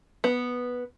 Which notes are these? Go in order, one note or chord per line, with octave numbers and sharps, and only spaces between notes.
B3